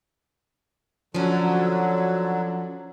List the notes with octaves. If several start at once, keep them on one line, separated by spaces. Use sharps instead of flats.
D3 F3 F#3 C#4